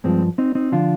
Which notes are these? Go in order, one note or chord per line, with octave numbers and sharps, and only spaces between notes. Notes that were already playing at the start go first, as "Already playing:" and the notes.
G2 F3 G#3 C4
C4 D#4
C4 D#4
D3 F3 D4 F4